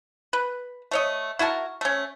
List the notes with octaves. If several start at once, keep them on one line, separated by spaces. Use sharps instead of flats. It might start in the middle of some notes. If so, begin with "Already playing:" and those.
B4
A3 C#5 D#5
E4 F#4 A#4 A5
A3 C#4